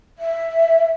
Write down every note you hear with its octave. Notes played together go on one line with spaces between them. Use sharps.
E5